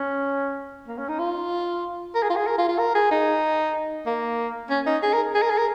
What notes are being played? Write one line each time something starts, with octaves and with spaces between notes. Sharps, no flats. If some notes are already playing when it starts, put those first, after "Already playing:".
Already playing: C#4
A#3
C#4
D#4
F4
A#4
G#4
F4
G#4
A#4
F4
F4
A#4
G#4
D#4
A#3
C#4
D#4
G#4
A#4
G#4
A#4
G#4
A#4